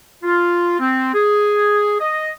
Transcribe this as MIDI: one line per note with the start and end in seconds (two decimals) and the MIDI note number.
0.24 0.76 65
0.79 1.13 60
1.14 1.94 68
2.00 2.31 75